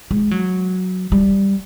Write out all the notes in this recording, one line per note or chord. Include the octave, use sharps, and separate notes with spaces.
G#3
F#3
G3